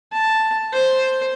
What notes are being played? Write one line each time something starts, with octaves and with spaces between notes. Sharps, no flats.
A5
C5